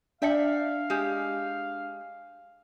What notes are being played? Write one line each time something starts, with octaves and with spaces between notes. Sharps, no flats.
D4 D5 E5 F5 G5 A5 C#7
G#3 G4